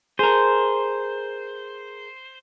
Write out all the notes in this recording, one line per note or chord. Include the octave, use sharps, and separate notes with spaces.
G#4 A#4 C5